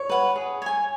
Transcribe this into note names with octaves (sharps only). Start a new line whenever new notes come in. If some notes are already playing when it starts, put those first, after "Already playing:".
Already playing: C#5
B4 F#5
G#4
C#5 G#5